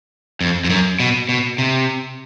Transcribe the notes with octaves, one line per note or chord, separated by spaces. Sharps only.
F2
F2
F#2
B2
B2
C3